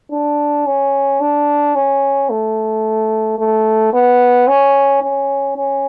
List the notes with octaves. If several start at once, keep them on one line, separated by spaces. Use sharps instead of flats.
D4
C#4
D4
C#4
A3
A3
B3
C#4
C#4
C#4